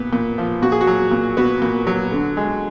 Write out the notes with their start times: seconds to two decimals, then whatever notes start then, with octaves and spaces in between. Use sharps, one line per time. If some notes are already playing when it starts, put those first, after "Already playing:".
Already playing: A#2 B3
0.13 A#2
0.38 F3
0.62 A#2 F#4
0.72 G#4
0.81 F#4
0.87 F#3
1.12 A#2
1.37 B3 F#4
1.62 A#2
1.87 F#3
2.12 D3
2.37 G#3